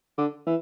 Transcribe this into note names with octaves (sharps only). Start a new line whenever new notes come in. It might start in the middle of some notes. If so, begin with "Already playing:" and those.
D3
E3